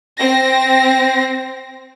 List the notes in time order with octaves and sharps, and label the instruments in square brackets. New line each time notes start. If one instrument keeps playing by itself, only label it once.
[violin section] C4 A#6